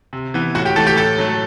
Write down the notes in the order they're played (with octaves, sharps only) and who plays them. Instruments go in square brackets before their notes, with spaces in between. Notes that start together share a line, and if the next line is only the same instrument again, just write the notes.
[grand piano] C3
E3 B3
A2 F#4 F#5
G4 G5
E3 A3 A4 A5
G4 G5
A2 A4 A5
F#3 A3